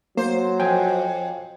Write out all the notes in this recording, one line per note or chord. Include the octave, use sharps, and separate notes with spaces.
F#3 A#3 C5
F2 G5 G#5